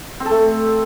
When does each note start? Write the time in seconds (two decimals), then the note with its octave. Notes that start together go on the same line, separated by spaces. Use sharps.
0.20 C4
0.26 A4
0.31 A3